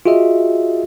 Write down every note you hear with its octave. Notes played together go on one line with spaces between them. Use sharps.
F4 F#4 G#4 D#5 E5